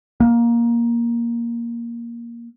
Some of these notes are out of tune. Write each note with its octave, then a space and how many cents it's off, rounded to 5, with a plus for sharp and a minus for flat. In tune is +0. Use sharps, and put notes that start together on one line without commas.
A#3 +10